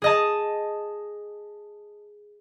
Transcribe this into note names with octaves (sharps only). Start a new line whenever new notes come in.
G#4 D#5 A5